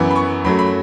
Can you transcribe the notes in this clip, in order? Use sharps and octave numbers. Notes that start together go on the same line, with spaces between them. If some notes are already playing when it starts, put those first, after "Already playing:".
Already playing: F#2 E3 B3
B5
C#6
F#2 F#3 A3 B5
B5